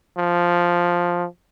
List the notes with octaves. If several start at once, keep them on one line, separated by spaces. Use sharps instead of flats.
F3